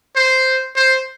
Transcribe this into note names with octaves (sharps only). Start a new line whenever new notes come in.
C5
C5